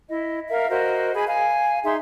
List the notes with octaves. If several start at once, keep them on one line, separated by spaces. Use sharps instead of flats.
E4 D#5
A#4 E5 F5
F#4 A#4 C5 D#5
G#4 G#5 B5
F5 G#5
D#4 G#4 E5 C6